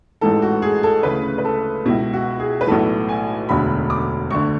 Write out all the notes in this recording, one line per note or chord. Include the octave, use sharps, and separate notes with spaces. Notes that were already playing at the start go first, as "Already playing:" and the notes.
A1 G#2 E3 A4
F#4
G#4
A4
D2 C#3 E3 B4
B4
A4
C#2 B2 E4
F#4
G#4
B4
B1 A2 E3 A4
G#5
E1 D2 D3 B5
D6
D2 D3 C#6